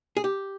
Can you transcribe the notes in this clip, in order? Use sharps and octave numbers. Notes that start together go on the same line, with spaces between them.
G#4
G4